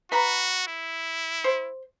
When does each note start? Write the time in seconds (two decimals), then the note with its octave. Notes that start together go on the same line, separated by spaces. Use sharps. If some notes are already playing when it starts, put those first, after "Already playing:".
0.12 F#4 B4 A#5 B5
0.68 E4
1.44 C5